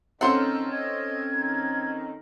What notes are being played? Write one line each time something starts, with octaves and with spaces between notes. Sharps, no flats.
D#3 C4 C#4 A4 C5 F5 F#5
D#5 G#6
D#3